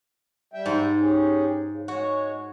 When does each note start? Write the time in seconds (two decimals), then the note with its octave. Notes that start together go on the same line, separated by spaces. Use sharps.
0.54 G3 E5 G5
0.66 G#2
1.00 C#4 G4 G#4
1.69 C#3
1.88 G#3 F#4 C#5